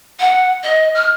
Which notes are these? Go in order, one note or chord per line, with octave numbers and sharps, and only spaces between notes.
F#5
D#5
F6